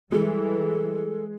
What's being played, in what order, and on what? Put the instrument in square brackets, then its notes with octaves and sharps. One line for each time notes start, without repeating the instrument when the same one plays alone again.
[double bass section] E3 G3 [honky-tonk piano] G#3 [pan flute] A4